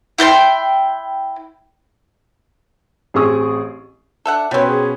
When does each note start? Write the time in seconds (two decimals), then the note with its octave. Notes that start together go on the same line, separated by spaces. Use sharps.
0.18 E4 G5 A5 C6
3.14 A1 C4 G#4 C#6 D#6
4.25 D4 A4 E5 F#5
4.51 B2 G3 C4 C#4 B4 C#5
4.68 G#4